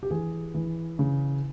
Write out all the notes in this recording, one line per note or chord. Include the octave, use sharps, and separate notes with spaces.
G4
E3 G#4
E3
C#3